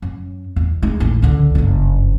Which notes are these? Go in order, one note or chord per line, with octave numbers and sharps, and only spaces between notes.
F#2
E2
G#3 D#4
A1 D#2
C#2 D3
F#1 G2